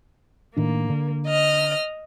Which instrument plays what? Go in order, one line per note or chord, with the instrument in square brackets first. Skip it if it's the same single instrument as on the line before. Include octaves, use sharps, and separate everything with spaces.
[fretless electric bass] A2 D#3 D4 [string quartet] A#3
[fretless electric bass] D3
[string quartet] D#5 F6